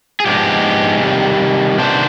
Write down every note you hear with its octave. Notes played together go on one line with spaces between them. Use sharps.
G#4
G#2 F3 G#3 B3 D4 G4
C3 D#3 G3
C3 D#3 B3 D4 C5